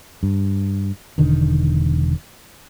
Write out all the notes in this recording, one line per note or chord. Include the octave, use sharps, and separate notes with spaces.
G2
E1 D3 D#3